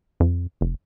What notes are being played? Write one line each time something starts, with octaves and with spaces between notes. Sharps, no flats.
F2
F1